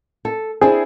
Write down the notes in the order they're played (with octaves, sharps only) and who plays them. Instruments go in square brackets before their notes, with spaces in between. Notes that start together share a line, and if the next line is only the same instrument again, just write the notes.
[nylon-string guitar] A4
[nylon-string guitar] C4 D4 E4 [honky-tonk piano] G#4